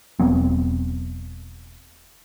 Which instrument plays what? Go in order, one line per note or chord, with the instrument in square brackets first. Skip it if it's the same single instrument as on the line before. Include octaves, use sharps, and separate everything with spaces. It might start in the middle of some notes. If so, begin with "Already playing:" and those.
[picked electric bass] E1 F#3 B3 C4